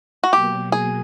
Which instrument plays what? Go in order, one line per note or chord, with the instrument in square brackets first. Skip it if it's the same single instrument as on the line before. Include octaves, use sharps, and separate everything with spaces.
[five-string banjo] F#4
[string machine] B2 F#3 A#3 [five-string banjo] G4
[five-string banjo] G#4